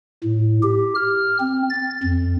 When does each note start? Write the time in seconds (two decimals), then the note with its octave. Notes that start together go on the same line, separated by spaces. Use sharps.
0.24 A2
0.63 G4
0.95 F6
1.40 C4
1.70 A6
2.04 F2